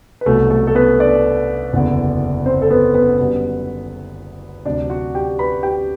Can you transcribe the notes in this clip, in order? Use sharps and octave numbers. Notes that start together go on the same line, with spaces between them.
B4
C2 B2 F#3 A3 A4
A3 A4
A4
B3 B4
D4 D5
F#1 E2 D3
C4 C5
A4
B3 B4
B3 B4
F#2 D3 G3 B3
D2 C3 F#3 D4 D5
F#4 F#5
G4 G5
B4 B5
G4 G5